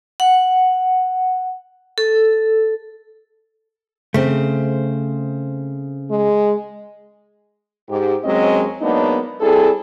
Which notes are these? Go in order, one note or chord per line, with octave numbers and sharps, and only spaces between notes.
F#5
A4
C#3 A3 C4 C5
G#3
G#2 G4
D#2 F#3 G#3 C4 C#4 D#5
F#3 G#3 A#3 B3 D4 D#4
G3 C4 E4 G#4 A4